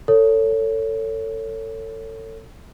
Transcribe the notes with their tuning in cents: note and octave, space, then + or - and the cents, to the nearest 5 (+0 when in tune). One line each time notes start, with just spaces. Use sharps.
A4 +30 C#5 +5